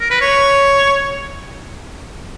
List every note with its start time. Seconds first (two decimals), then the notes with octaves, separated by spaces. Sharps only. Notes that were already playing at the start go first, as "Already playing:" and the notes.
0.01 A#4
0.11 B4
0.21 C#5